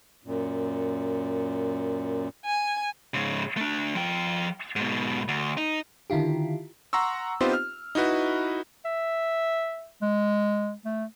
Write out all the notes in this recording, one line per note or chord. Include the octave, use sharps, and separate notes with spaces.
F#2 A#2
G#5
G#2 C#3
A3 D4
F3 G5
G#2 B2
D2
D#4
D3 D#3 E4 F4 G4
F#5 A#5 C6 C#6 E6
B3 C4 D#4 F4 G4 C5
F6
D#4 E4 F#4 B4
E5
G#3
A3